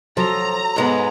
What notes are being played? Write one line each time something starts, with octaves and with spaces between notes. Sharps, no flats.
F3 F#3 A4 A#5
G#2 G#3 B3